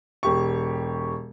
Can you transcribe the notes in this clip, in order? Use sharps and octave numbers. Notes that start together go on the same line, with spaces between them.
E1 G4 C#6